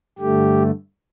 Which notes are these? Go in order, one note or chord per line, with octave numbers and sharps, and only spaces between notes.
G2 D3 A3 G4